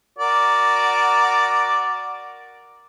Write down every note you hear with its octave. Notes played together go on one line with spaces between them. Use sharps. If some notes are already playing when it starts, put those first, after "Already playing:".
F#4 A#4 D5